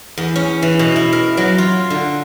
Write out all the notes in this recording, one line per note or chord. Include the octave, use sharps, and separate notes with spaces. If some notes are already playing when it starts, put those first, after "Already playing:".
E2
C#4
E3
B2
E4
A#4
F#3
F4
D3